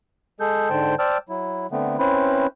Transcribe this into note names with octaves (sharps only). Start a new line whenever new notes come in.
G#3 G#4 A4 G6
G#2 D3 C5 G5 A5 G6
C5 D5 G5 A5 E6 F6
F#3 E4
D3 A3 B3 C4
C4 C#4 E4 B4 C5